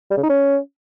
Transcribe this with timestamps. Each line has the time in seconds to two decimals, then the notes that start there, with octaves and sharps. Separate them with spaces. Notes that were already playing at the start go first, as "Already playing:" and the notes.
0.11 G3
0.17 C#3
0.23 D#4
0.29 C#4